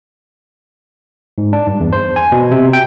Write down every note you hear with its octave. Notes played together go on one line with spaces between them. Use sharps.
G#2
D4
G2
E2
C5
G#5
B2
C3
G5